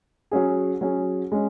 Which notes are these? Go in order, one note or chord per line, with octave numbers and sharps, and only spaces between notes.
F#3 C#4 G#4
F#3 C#4 G#4
G#3 C#4